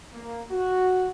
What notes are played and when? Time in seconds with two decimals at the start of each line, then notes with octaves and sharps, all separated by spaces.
0.13 A#3
0.51 F#4